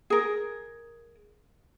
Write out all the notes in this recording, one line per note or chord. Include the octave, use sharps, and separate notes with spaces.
G#4 A#4